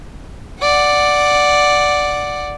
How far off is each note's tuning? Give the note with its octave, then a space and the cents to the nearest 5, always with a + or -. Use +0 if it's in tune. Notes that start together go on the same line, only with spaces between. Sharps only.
D5 +0 F#5 +0